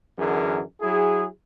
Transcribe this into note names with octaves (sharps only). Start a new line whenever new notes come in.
F#2 D3 E3 G#4 A#4
F#3 E4 G#4